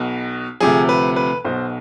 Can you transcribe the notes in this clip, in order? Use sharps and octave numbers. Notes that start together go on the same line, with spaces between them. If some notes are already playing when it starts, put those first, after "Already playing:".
Already playing: B1 B2
D2 C3 F3 G#4
B4
B4
B1 B2 C5